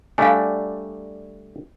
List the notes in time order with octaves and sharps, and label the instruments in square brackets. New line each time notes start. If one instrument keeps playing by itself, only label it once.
[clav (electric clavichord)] G3 A3 D4 [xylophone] F5 G#5